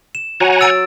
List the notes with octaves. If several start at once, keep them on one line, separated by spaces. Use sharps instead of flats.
E7
F#3 F#5 G#5 A#5
E6 A6 D7